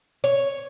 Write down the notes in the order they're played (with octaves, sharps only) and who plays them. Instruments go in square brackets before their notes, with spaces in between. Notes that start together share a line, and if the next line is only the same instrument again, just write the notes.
[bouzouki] C#5